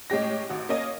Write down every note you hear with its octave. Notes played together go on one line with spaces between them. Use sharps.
A2 G#3 C#4 G4 A#6
G#1 F#4
A#3 C#4 D#5 D#7